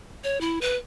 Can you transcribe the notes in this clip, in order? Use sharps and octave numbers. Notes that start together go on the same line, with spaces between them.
C#5
E4
B4